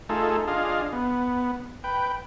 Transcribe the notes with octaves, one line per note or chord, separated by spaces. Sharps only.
A3 D#4 F4 G#4 A4
D4 F4 G#4 D#5 F5
B3
B4 G5